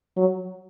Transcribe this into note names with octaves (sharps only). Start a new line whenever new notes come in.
F#3